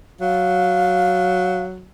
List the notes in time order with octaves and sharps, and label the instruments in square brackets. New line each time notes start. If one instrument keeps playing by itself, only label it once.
[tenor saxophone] F#3 [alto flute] F5